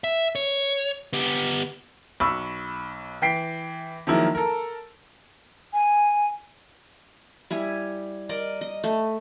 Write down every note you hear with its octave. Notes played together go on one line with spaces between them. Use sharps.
E5
C#5
B3 G4
B1 B5 C#6 E6
E3 G5 B6 C7 D7
D#3 F3 F#3 G#3 A#3 E4
A4 A#4
G#5
G3 E4 G#5
A#4 D5 D#5
D#5
A3